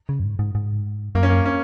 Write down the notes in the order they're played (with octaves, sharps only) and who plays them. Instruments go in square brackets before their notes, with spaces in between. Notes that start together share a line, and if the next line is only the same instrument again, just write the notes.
[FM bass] C#3
F#2
G#2
G#2
G#2
[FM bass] F#2 [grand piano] A#3
[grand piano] C#4
A#3
C#4